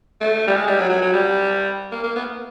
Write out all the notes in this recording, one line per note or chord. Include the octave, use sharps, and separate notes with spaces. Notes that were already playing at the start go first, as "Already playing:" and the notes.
A3
G3
G#3
G3
F#3
F#3
F#3
G3
A#3
A#3
B3